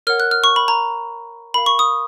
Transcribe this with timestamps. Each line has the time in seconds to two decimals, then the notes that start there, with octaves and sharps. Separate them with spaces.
0.07 A#4 C#5 F#5 F6
0.20 F#6
0.31 F6
0.44 C#6
0.56 B5
0.68 A#5
1.54 A#4 F5 B5
1.66 C#6
1.79 D#6